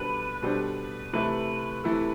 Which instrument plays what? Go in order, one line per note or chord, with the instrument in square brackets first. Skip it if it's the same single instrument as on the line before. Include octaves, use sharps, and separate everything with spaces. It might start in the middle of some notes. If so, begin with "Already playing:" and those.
Already playing: [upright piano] B2 G3 D4 A4 C5 [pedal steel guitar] B4
[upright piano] B2 G3 D4 A4 C5
[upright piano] C3 E3 A3 E4 A4 [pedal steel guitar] B4
[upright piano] C3 E3 A3 E4 A4